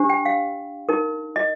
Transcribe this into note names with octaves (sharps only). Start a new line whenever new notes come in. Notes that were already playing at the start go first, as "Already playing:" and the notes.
Already playing: D4 G4 C5
G5
F5
D#4 A#4
D#5